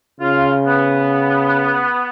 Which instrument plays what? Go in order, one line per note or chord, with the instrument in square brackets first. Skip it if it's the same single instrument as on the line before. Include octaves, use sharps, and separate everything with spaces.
[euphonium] C#3 [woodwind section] F4
[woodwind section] B3